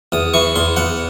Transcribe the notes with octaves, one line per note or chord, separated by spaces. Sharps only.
E2 D#6
E3 C#6
E2 C6
E2 F#5